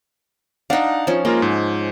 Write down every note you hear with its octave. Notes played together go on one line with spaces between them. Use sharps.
D4 D#4 F5 F#5
F3 C#4
G#3 A#3 F4 A#4
G#2